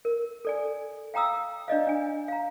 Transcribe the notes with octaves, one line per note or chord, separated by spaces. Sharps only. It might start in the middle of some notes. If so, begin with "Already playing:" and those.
A#4
A4 D5 G#5
F5 G5 A#5 D#6 E6
D4 D5 D#5 F5
D4 G#5
F5 A#5